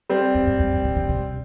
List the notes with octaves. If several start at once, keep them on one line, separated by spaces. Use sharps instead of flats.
G3 C4
F2
G2
F2
G2
C3
D3
C3